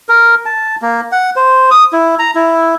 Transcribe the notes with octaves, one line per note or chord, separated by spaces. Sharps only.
A#4
A5
A#3
F#5
C5
D#6
E4
A#5
E4